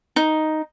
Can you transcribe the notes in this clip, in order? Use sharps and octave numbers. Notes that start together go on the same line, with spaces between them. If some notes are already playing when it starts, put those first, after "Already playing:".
D#4